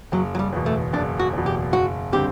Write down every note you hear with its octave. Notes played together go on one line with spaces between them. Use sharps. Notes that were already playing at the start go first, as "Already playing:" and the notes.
F#1 F#3
F#3
G3
E2 B2
A3
F#1 D4
F#4
E2 B2
G4
F#1 F#4
D3 G3 C4 G4